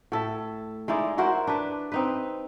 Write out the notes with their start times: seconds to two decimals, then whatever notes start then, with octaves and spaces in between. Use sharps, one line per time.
0.12 A2 A4 E5
0.88 G#3 D#4 E4 D5
1.18 E4 F#4 A#4 C5
1.47 D4 B4
1.92 C4 D#4 B4